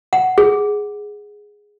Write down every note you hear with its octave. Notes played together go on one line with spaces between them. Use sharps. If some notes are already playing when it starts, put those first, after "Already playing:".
F#5
G#4